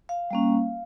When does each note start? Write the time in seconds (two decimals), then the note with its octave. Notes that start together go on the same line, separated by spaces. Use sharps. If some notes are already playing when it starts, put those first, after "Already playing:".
0.09 F5
0.31 G3 A#3 C#4